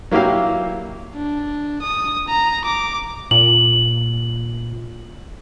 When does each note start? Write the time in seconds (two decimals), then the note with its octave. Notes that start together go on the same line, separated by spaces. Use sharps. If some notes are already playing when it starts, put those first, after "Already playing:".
0.11 F#3 A#3 E4 G4 F5
1.14 D4
1.82 D#6
2.28 A#5
2.65 D6
3.31 A#2 F#7